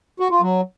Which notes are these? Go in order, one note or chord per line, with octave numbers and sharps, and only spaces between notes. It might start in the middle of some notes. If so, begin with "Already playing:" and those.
F#4
F4
F#3